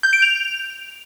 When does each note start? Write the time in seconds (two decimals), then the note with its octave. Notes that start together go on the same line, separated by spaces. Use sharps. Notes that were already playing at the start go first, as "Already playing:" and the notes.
0.03 G6
0.13 D7
0.22 F7